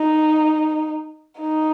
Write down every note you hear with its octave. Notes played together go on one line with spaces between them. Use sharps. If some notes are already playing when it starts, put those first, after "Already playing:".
Already playing: D#4
D#4